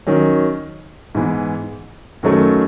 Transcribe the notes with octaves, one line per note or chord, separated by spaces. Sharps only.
D#3 F#3 C#4
G#2 E3 B3
F#2 D#3 F#3 A3